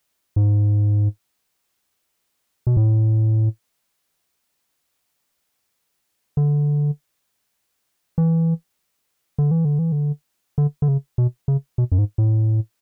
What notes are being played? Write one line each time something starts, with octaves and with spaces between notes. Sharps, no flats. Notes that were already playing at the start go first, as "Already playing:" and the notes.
G#2
B2
A2
D3
E3
D3
E3
D3
E3
D3
D3
D3
C#3
B2
C#3
B2
F#2
G#2
A2